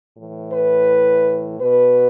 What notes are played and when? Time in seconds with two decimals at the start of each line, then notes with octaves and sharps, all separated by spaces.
0.17 A2 E3
0.52 B4
1.59 B2 B4